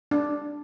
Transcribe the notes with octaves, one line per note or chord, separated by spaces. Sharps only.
D4